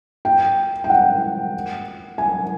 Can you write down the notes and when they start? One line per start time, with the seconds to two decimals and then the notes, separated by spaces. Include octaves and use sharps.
0.25 G5
0.84 G5
0.90 F#5
2.18 G#5